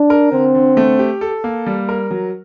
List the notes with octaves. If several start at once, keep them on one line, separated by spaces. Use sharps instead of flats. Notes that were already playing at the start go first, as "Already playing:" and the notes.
Already playing: D4
A#4
D3 C4
D3
A3
G4
A4
A#3
G3
A#4
F#3